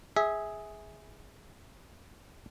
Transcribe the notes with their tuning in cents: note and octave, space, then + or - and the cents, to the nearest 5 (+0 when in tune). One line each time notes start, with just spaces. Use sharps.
G#4 +0 E5 -20